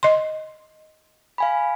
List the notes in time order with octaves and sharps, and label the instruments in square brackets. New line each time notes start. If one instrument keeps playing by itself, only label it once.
[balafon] D#5 C6
[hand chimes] F5 G#5 B5